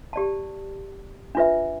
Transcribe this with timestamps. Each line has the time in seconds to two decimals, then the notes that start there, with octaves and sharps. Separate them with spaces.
0.13 G4 D5 A5
1.35 D4 F4 B4 E5